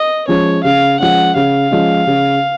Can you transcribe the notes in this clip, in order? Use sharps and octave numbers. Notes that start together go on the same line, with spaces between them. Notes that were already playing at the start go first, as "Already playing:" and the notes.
Already playing: D#5
F3 G#3 C#4 C#5
C#3 F5
F3 G#3 C#4 F#5
C#3 F5
F3 G#3 C#4
C#3